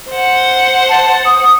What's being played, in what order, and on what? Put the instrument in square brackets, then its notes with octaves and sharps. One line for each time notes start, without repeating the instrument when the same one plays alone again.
[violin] C5 F#5
[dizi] A5
D#6